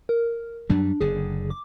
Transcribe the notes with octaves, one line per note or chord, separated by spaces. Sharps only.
A#4
F#2 F#3 G3 D4
F#1 D3 G#4
D6